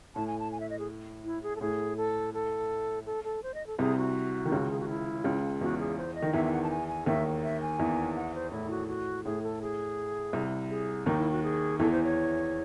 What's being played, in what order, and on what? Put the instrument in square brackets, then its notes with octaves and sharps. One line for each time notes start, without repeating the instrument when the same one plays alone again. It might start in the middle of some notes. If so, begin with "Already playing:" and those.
[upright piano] A2 [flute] A5
[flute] G#5
A5
G#5
E5
D#5
G#4
E4
G#4
A4
[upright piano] A2 [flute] G#4
[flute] A4
A4
A4
A4
C5
D#5
A4
[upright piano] C2 C3 [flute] G#4
[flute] F#4
[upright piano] D#3
C#2 C#3
[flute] G#4
F#4
E4
[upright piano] C#2 C#3
[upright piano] E2 E3 [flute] F#4
[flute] G#4
C5
D#5
[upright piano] D#3
[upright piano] E2 E3 [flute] E5
[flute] E5
F#5
A5
G#5
G#5
[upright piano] D#2 D#3 [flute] E5
[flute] E5
G#5
[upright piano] E2 E3
[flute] F#5
C5
[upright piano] A2 [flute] E4
[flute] F#4
F#4
[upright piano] A2 [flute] G#4
[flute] A4
G#4
[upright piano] C2 C3
[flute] G#4
[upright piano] D#2 D#3 [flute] D#4
[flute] E4
F#4
G#4
[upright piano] E2 E3 [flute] A4
[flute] C5
C#5